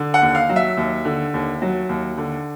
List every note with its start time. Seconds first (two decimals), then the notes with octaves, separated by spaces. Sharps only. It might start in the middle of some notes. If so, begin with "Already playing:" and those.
Already playing: D3
0.14 F#5
0.21 D#2
0.35 F5
0.49 F#3
0.56 E5
0.77 D#2
1.05 D3
1.34 D#2
1.62 F#3
1.89 D#2
2.18 D3